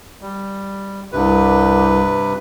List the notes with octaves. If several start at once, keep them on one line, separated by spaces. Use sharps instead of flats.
G3
C2 G2 C3 B4